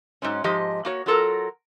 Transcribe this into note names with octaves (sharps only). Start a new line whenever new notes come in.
G#2 F#3 G#3 C#4
G#2 F3 G4 D#5
A#3 F#4 C#5
F#3 F4 A4 A#4 A#5